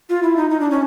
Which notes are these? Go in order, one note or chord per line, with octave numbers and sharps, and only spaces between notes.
F4
E4
D#4
D#4
D4
C#4